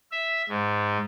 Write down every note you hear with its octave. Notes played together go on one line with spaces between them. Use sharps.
E5
G#2